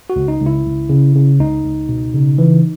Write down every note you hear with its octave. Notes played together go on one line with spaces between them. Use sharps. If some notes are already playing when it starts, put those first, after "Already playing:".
F#4
C#2
D#4
C#2
E4
C#2
C#3
C#3
C#2 D#4
C#2
B2
C#3
E3